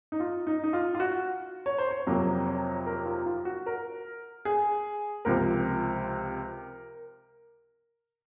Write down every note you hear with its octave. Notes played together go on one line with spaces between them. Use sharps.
D#4
F4
D#4
D#4
F4
F4
F#4
C#5
C5
C#5
F2 C3 F#3 A#3
C#5
A#4
F4
F4
F#4
A#4
G#4
C#2 C3 F3 A#4